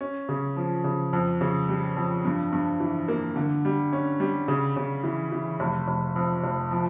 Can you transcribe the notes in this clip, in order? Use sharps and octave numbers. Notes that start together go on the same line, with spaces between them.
C#4
C#3
F3
C#3
F2
C#3
G3
F2
G2
G2
E3
A#3
D3
G3
C#4
G3
C#3
C#3
E3
E3
F1
F1
F2
F1
F3